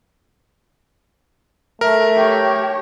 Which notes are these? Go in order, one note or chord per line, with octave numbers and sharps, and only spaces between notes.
A3 A#4 E5
G4 C#5